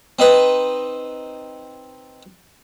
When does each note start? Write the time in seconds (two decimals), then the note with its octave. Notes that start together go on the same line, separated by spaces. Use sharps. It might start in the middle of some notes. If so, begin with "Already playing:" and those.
0.19 C4 D#4 B4